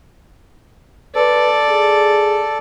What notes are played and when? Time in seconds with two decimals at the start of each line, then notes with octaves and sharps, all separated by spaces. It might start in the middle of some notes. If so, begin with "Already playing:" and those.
1.15 A4 B4 D5
1.69 G#4